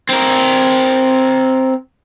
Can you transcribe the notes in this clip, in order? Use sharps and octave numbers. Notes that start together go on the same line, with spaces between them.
C4 A#4